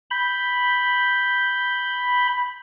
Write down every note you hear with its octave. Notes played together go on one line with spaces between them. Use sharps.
B5 G6